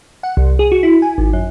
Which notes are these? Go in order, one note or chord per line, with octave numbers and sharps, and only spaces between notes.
F#5
C2
G#4
F#4
E4
G#5
G#1
F#2